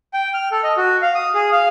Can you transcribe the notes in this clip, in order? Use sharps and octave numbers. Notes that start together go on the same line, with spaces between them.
G5
F6
A4
D#5
F#4
F5
D#6
G#4
F5